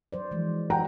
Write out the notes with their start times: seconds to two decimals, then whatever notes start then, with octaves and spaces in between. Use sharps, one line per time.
0.12 F#3 C5 D5
0.31 E3 F3 G#3
0.70 F#4 F#5 G5 A#5